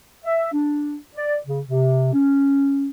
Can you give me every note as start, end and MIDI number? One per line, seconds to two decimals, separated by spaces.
0.24 0.51 76
0.53 0.96 62
1.16 1.37 74
1.46 1.60 49
1.68 2.11 48
2.13 2.88 61